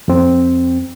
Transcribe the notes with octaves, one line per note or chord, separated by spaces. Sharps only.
F2 C4